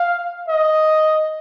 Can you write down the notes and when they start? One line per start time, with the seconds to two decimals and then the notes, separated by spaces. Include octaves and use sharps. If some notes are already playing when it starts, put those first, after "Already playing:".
Already playing: F5
0.48 D#5